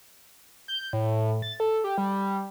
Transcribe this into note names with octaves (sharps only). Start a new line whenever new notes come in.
G6
A2
A6
A4
G4
G3